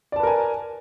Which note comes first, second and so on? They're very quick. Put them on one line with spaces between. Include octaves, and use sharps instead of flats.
D5 A5 B4 A#4 G#5